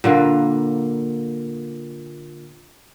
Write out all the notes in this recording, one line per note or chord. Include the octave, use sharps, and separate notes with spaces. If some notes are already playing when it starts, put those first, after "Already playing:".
A#2 D3 A#3 B4